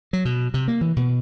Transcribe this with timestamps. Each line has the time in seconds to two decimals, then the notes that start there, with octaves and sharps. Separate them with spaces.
0.13 F#3
0.25 B2
0.54 C3
0.68 A#3
0.81 E3
0.96 B2